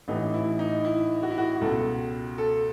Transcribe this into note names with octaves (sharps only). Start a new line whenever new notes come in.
A1 A2 E3 D#4
E4
D#4
E4
F#4
E4
F#4
C#2 B2 A4
A4